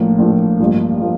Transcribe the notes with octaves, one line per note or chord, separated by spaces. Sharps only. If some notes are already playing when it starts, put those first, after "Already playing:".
Already playing: A#1 A2 F3 A#3
A#1 A2 F3 A#3
A1 G2 F3 A#3
F3 A#3